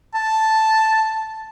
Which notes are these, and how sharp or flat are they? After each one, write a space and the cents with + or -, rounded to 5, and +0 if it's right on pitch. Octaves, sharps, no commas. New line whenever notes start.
A5 +0